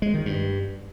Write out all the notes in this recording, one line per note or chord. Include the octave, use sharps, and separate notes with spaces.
G#3
D#3
G2